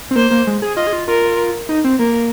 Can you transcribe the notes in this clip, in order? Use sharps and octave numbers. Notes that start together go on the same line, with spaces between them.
C4
A#3 C5
A#3
G#3
G#4
F4 D#5
G#4
F4
F4 A#4
D#4
C4
A#3 A#4